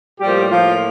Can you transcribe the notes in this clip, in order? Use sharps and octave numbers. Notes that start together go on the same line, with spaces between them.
A2 F3 G3 A#3 G4
F3 F4